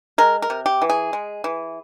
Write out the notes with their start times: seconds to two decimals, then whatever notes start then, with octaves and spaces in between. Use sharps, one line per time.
0.18 G#3 A#4
0.42 A#4
0.50 C3
0.66 G4
0.82 E3
0.90 G#4
1.13 G#3
1.44 E3